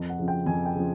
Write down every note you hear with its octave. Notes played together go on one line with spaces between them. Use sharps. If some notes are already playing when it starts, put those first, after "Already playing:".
Already playing: F2
F#5
C#3 F3
G5
F2 G#5
G5
C#3 F3